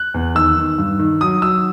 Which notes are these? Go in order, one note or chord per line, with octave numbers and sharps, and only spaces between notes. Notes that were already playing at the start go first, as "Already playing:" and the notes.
Already playing: F#6
E2
D#3 E6
D#3
G2
D#3
F#3 D#6
F#3 E6